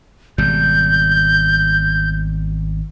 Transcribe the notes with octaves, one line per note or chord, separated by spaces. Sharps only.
G#1 B2 G3 G6